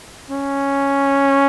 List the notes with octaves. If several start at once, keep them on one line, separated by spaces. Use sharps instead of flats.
C#4